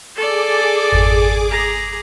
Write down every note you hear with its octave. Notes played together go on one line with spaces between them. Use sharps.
G#4 A4 D5 D6
G#1 F2 A6
G#4 A#5 D6